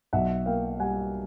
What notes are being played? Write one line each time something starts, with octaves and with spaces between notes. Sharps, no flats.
B1 E5 F#5
A#3 F5 G5
G3 F#5 G#5